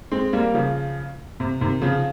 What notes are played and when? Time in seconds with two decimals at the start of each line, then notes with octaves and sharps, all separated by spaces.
0.12 G#3 C4
0.33 G3 A#3
0.54 C#3 F3
1.40 C3
1.61 C3 D#3
1.82 C#3 F3